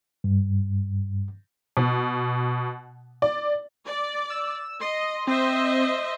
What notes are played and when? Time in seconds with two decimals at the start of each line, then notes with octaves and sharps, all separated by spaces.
0.24 G2
1.77 B2
3.22 D5
3.86 D5
4.30 E6
4.81 D#5 C6
5.27 C4 C5 D#5 E5